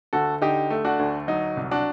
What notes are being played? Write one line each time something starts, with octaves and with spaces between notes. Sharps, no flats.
D2 F#4 A4
D3 D#4 G4
A3
D4 F#4
D2
F#3 D#4
C2
D4 F#4